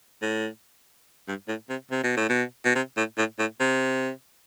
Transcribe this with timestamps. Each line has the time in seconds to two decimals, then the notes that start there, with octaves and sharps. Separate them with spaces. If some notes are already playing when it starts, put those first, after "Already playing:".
0.22 A2
1.28 G2
1.48 A2
1.70 C3
1.91 C3
2.04 B2
2.17 A2
2.29 B2
2.65 B2
2.75 C3
2.97 A2
3.18 A2
3.39 A2
3.60 C3